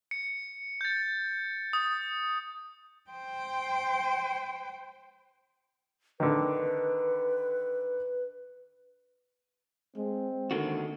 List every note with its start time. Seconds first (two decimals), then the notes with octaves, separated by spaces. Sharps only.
0.11 C#7
0.81 G6 A6
1.73 D#6
3.10 C5 G5
6.20 D3 D#3 B4
9.96 G#3 C4
10.51 D#2 D3 D#3 F#4